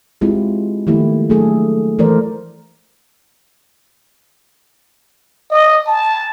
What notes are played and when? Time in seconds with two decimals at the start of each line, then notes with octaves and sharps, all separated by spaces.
0.21 G#3 C4 E4 F4 G4
0.87 D#3 F3 A3 A#3 E4 G4
1.30 F#3 A3 D4 G#4 A4
1.99 E3 A3 A#4 C5 D5
5.51 D#5
5.87 A5